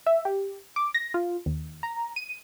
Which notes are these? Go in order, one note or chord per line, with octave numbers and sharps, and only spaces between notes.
E5
G4
D6
A#6
F4
D#2
A#5
D#7